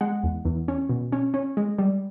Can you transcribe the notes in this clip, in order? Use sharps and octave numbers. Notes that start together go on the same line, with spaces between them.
G#3 F#5
E2
E2
C#4
B2
C#4
C#4
G#3
G3